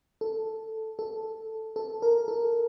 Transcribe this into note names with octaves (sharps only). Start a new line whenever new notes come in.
A4
A4
A4
A#4
A4